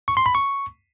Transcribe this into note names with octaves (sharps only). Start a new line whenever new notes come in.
C#6
C6
B5
C#6